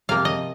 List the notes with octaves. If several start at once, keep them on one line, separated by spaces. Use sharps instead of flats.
C3 F3 A#3 F5
D#5